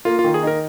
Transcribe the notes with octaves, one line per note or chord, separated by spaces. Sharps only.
A#3 F4
F4
D#3
G#4
D#4 A#4